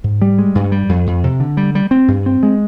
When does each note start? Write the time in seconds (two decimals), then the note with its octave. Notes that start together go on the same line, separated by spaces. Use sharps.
0.04 G#2
0.22 G3
0.39 G#3
0.55 G2
0.72 G3
0.89 F2
1.07 F2
1.24 C3
1.40 D3
1.57 G3
1.75 G3
1.91 C4
2.08 G2
2.26 C4
2.43 G#3